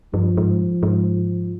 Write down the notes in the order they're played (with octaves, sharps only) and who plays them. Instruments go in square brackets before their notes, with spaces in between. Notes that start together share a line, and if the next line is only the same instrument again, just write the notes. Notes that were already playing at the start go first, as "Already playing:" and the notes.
[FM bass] G2 [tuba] F3
[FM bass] G#2
G#2